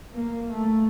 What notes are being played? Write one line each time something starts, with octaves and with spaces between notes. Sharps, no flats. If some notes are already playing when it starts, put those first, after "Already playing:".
A#3
A3